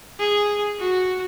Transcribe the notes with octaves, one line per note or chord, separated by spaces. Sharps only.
G#4
F#4